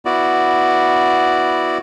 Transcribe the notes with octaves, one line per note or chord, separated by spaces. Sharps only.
B3 E4 F#4 D5